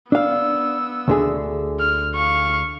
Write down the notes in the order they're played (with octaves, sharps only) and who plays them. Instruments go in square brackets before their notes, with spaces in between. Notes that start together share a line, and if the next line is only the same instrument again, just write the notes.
[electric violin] B3 E6 [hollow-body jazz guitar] D4 F5
[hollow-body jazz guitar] D2 D3 G#4
[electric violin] F6
F5 C#6